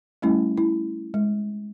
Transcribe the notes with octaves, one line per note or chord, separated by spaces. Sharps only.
G3 A3 C#4 E4
E4
G#3